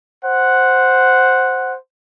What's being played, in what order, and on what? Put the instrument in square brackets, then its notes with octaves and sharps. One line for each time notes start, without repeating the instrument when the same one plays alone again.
[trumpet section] C5 F#5